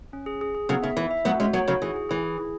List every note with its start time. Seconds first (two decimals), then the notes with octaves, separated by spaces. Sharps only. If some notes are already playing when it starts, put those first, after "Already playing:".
0.13 C#4
0.26 G#4
0.41 G#4
0.55 G#4
0.69 C#3 F#3 B3
0.83 C#3 E5
0.97 E3 E5
1.11 E5
1.25 F#3 B3 F#4
1.40 G#3 C#4 F#4
1.53 F#3 B3 C#5
1.68 C#3 F#3 F#4
1.82 E3 G#4
1.96 G#4
2.09 E3 G#4
2.24 G#4
2.38 G#4